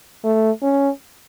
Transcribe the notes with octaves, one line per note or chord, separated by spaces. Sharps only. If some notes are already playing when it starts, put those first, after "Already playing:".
A3
C#4